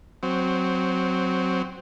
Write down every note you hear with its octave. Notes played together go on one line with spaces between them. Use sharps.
F#3 C4